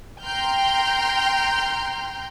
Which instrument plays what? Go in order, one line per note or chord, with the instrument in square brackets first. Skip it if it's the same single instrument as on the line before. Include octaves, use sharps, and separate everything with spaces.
[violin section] G5 A#5 C6 F6 G6